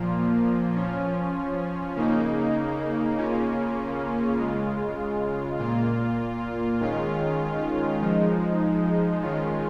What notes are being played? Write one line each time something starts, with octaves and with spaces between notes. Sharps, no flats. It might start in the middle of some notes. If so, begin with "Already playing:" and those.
Already playing: A#2 F3 A#3 F4
F3 C#4 F4
C#3 A#3 D#4
C#3 A#3 C#4 F4
C#3 G#3 F4
A#2 A#3 F4
D#3 G#3 C#4 F4
F3 G#3 D#4
D#3 G#3 C#4 F4